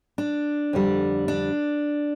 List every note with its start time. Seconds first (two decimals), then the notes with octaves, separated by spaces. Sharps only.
0.18 D4
0.73 F2 D3 G3
1.28 D4